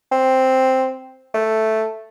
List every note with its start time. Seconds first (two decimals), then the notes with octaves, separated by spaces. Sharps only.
0.12 C4
1.34 A3